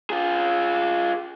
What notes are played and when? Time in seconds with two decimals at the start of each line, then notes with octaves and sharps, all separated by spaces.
0.10 F4 G#4